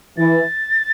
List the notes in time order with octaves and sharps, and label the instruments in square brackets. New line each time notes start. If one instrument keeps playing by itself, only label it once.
[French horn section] E3 [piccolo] A6